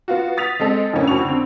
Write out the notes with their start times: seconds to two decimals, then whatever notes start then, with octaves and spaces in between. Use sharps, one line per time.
0.08 B3 F4 F#4
0.37 D#6 A6 B6 F7
0.60 G#3 C4 A4 D#5
0.93 F2 A2 D3 A#3 C#4
1.07 F2 F#4 C#6 F7
1.24 D3 C4